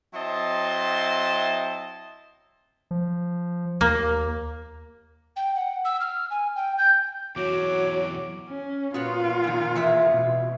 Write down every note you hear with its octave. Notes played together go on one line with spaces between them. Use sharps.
F#3 C4 E4 D#5 A5 C6
F3
D#2 A#3
G5
F#5
E6
F6
G#5
G5
G6
E2 F#3 F#4 C#5 D6
C#4
A#2 B3 F4 F#4 C#5
F2 D#3
E3 G#3 E5
B2